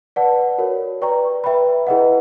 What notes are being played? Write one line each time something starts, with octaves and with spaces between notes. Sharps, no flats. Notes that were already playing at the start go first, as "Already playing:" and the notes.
B4 D5 F#5 A5
F#4 A#4 C#5
B4 D5 G5 A#5 C#6
B4 E5 G5 B5
E4 G#4 B4 D#5 F#5